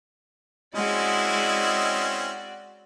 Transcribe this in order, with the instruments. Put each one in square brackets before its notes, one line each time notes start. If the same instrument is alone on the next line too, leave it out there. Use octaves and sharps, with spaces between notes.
[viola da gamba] G#3 [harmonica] C4 C#4 E4 [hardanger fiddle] F#4 D5 [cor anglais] D#5